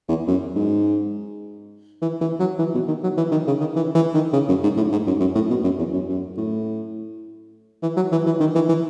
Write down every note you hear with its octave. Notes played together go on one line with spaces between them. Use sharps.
E2
F#2
G#2
E3
E3
F#3
E3
B2
D#3
F#3
E3
D#3
C#3
D#3
E3
E3
D#3
C#3
F#2
G#2
A2
G#2
F#2
F#2
A2
B2
F#2
E2
F#2
F#2
A2
E3
F#3
E3
E3
D#3
E3
E3